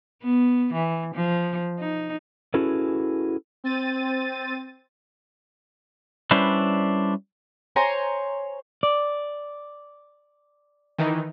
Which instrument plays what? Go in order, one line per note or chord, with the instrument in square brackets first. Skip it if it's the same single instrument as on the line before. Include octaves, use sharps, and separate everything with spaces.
[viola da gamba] B3
E3
F3
D#4
[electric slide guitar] C#4 E4 F#4 G#4 A4 B4
[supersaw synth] C4 A6 D#7
[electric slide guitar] G3 C#4 D4 E4 B4 C5
[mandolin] C5 C#5 G#5 A#5
[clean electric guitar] D5
[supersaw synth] D#3 E3 D#4